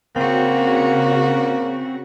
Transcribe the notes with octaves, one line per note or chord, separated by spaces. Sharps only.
C#3 A#3 C4 F#4